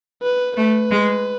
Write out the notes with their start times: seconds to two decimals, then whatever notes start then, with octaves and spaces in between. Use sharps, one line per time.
0.23 B4
0.57 A3 B4
0.91 G#3